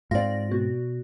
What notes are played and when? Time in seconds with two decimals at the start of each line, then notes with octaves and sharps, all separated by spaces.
0.11 G#2 C4 F4 D5 A#6
0.51 B2 F#4